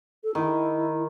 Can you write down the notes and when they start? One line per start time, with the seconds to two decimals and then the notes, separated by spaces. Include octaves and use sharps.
0.24 A4
0.35 D#3 E4